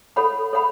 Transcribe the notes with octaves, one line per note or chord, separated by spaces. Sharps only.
A4 C#5 F#5 B5
A4 C#5 F#5 B5